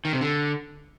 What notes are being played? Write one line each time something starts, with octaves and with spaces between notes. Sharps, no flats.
D#3
C3
D3